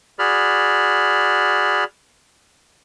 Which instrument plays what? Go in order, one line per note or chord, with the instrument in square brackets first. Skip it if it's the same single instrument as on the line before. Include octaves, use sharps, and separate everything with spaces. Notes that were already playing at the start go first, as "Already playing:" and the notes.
[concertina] F#4 G#4 D5 B5 F6